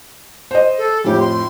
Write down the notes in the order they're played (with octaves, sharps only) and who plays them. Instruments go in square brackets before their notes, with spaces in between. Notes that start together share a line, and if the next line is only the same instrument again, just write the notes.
[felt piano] C5 D#5
[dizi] A4
[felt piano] F2 A2 [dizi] G4
[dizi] C6